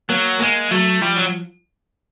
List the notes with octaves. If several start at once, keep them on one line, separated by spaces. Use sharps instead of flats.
F#3 A#3
G#3 A#3
F#3 A3
F3 G3
F#3